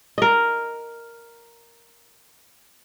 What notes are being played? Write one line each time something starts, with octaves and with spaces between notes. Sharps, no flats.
A#4 D#5